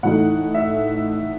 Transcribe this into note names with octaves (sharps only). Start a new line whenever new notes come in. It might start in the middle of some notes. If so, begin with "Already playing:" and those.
A2 E3 A3 D#4 F#5
E5